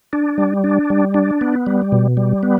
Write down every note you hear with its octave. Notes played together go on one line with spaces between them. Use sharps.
D4
G3
D4
G3
D4
B3
G3
B2
G3
B3